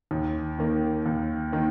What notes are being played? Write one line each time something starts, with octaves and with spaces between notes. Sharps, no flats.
D#2
D#3 A#3
D#2
D#3 A#3